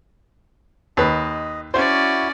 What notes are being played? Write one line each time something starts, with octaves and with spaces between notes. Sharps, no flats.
D#2 B4 D#5
C#4 E4 F#4 C5 D5